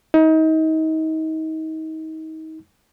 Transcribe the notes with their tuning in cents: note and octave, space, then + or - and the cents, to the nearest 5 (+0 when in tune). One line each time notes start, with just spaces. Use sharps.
D#4 +30